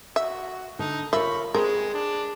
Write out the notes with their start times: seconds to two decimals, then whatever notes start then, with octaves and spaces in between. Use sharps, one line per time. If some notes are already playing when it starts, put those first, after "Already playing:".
0.16 F#4 E5
0.79 D3 D#4
1.13 F4 A#4 C#5 E5 B5
1.54 G#3 C4 G#4 A#4
1.94 D4